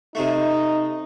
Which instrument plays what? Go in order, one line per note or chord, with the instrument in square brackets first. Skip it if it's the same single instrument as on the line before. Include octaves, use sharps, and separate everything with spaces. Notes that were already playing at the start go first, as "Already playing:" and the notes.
[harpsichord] C3 A3 [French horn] D#4